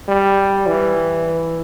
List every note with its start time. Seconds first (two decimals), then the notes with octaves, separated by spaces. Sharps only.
0.08 G3
0.67 E3